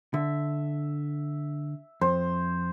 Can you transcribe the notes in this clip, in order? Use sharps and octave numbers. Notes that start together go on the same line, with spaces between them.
D3 E5
F2 C5